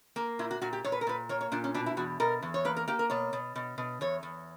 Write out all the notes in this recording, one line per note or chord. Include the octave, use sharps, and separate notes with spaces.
A#3
A#2 E4
F#4
A#2 F#4
G4
A#2 C#5
B4
A#4
A#2 B4
A#3 C#5
C#5
A#2 D4
C#4
B2 D4
E4
E2 F#4
B2 A#4
E2
C#5
A#3 B4
A#4
A#3 G4
A#4
B2 C#5
B2
B2
B2
E2 C#5
E2